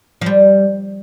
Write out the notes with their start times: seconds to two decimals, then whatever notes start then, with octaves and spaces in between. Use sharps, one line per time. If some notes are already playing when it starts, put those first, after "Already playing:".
0.21 F3
0.26 G3